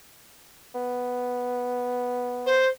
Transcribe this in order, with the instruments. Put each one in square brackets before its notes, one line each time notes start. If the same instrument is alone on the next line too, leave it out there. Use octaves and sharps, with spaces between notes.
[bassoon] B3
[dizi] C5